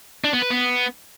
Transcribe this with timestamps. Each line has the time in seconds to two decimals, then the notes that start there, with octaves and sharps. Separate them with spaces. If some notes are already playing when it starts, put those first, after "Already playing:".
0.24 D4
0.33 B3
0.42 B4
0.51 B3